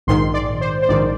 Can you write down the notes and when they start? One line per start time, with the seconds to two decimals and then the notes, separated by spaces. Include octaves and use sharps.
0.07 A#1 G#2 D#3 C6
0.34 D5
0.61 C5
0.83 C5
0.88 A#1 G#2 D#3 D5